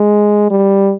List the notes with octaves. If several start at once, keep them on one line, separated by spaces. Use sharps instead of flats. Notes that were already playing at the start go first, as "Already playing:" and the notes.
Already playing: G#3
G3